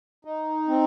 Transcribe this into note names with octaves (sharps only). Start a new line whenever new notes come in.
D#4
C4